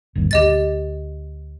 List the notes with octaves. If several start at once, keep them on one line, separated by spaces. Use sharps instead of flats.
G1 D#2 A#2
D2 G4 D#5 A6